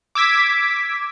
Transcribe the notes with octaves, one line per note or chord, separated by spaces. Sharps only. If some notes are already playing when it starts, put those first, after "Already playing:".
D6 E6 G#6 B6